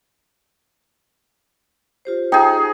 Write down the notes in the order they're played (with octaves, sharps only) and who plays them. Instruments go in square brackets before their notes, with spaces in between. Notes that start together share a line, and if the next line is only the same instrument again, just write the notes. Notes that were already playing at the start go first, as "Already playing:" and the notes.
[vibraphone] F4 G4 C5
[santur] D#4 G#4 [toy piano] G5